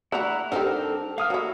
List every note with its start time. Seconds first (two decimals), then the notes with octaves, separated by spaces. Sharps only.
0.12 A3 D4 E4 F#4 F#5 A#5
0.52 G3 C4 D4 D#4 A4 A#4 F#5
1.18 A#3 F5 D#6 F6
1.30 F#3 E4 F#4 A4